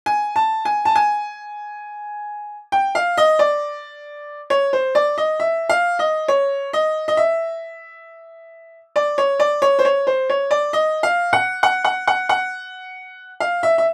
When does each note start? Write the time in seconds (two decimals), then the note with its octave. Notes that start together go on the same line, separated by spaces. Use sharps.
0.06 G#5
0.36 A5
0.65 G#5
0.85 A5
0.95 G#5
2.72 G5
2.95 F5
3.17 D#5
3.39 D5
4.50 C#5
4.73 C5
4.95 D5
5.18 D#5
5.40 E5
5.69 F5
5.99 D#5
6.28 C#5
6.73 D#5
7.08 D#5
7.17 E5
8.96 D5
9.18 C#5
9.40 D5
9.62 C#5
9.79 C5
9.85 C#5
10.07 C5
10.30 C#5
10.51 D5
10.73 D#5
11.03 F5
11.33 F#5
11.63 F#5
11.85 F#5
12.07 F#5
12.29 F#5
13.40 F5
13.63 E5
13.78 E5